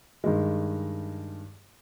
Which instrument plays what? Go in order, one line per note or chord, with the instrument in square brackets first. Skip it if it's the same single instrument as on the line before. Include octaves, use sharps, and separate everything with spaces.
[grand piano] G2 D#3 G#3